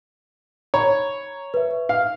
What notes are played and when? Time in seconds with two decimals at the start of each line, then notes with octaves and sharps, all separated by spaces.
0.74 C#5 A#5 B5
1.54 B4 E5
1.89 F5